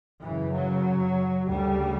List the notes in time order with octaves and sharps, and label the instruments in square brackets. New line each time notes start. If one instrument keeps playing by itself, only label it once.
[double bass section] F#2 C#3 E3
F#3
D2 C#3 G3